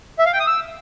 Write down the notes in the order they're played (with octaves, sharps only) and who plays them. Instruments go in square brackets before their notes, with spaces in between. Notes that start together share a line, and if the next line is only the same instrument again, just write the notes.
[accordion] E5
F5
G5
D#6
E6